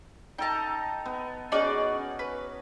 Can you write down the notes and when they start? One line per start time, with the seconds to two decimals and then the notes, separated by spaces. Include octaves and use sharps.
0.38 D#4 A4 G5 A5 A#5
1.06 B3
1.52 C#4 D#4 F#4 G#4 D5
2.19 B4